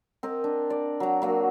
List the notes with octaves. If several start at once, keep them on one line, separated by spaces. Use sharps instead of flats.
C4 A#4 D#5
D4
D5
F#3 A#5
F#3 A#3 F#4